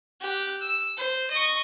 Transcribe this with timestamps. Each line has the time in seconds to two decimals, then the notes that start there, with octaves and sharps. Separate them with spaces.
0.21 G4 F#6
0.61 E6
0.97 C5
1.30 D#5 C#6